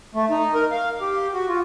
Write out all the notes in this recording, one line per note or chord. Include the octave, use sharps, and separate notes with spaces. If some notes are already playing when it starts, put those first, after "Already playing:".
A3
D#4
A#4
F5
G4
F#4
F4